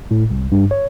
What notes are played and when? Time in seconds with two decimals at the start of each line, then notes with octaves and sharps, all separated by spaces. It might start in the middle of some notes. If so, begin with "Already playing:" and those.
0.11 A2
0.31 C2
0.52 G2
0.71 C#5